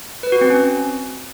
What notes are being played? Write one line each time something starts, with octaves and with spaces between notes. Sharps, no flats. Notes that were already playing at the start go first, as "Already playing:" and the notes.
B4
F#4
C4
C#4